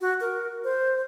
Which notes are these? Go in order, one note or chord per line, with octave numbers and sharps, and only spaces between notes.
F#4
A#4
C5